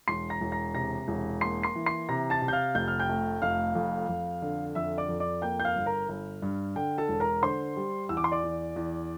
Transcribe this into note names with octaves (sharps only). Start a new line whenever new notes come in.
E1 C6 C7
A#5 A#6
E1
A#5 A#6
C3 A#5 A#6
E1
A#3 C6 C7
C6 C7
E3
C6 C7
C3 A#5 A#6
A5 A6
C3
G6
F5 F6
F1 G6
F6
G5 G6
A3
F1 F5 F6
F2
F2
D3
F2 E5 E6
D5 D6
F2
D5 D6
A#3 G5 G6
G6
F5 F6
G1
A#4 A#5
G1
G2
D3 G5
A4 A5
E1
A#4 A#5
D3 C5 C6
G3
E2 E6
D6
C6
D5 D6
E2
E2